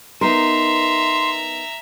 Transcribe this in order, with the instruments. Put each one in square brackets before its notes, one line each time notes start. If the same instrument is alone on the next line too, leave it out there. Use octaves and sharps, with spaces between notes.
[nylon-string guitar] B3 D#4 A#4 [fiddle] E5 A#5 [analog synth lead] C6